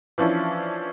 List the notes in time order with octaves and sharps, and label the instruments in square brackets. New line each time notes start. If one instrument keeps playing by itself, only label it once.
[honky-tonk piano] E3 F3 C#4 D4 E4